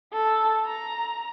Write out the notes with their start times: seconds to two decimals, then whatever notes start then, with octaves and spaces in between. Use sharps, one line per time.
0.13 A4
0.66 A#5